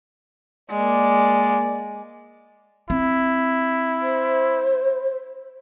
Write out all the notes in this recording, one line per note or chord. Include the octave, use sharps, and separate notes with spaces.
G#3 A#3 D5
C4 E4
C5